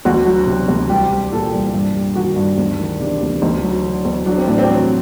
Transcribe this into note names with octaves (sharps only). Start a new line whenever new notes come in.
D2 F#4
F#3
C3
D2
C2 G4
G3
A#2 A4
C2
G2
G3
D#3 F#4
G2
D2
D#3
C3 D4
D2
D2 D#4
F#3
D3
D2
F#3 D4
C4
A2 D4
C4
F#3